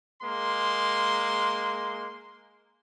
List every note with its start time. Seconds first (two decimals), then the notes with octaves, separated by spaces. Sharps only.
0.23 G#3 A#3 C6